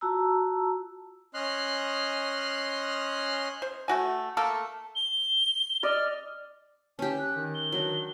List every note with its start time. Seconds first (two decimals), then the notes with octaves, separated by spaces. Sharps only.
0.01 F4 F#4 A5 A#5 E6
1.34 C#4 D#5 C6 F6 F#6
3.62 C5
3.88 A3 F#4 G#5
4.37 A3 A#3 A4 F5
4.95 G7
5.83 D5 D#5 F6
6.99 C#4 G4 A5
7.19 F#6
7.34 D#3
7.55 G7
7.72 F#3 D4